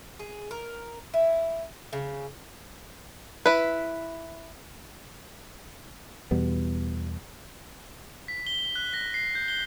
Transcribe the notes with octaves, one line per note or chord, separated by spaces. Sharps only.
G#4
A#4
E4
C#3
E4 B4
E2 B2 G3 B3
B6
G7
F#6
A#6
C7
G6
G7